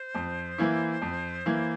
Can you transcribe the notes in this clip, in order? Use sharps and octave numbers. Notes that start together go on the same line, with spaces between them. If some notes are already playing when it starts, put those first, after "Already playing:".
Already playing: C5
F2
E3 A#3 E4
F2
E3 A#3 E4